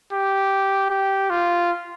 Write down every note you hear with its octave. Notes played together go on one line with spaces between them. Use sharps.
G4
G4
F4